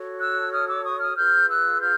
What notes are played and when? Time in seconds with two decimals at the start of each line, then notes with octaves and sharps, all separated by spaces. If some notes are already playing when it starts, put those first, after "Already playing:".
Already playing: F#4 A4 C#5
0.20 E6 F#6
0.51 D#6 F6
0.68 D6 E6
0.84 C#6 D#6
1.01 D#6 F6
1.16 F4 G#4 B4 F6 G6
1.48 E6 F#6
1.80 F6 G6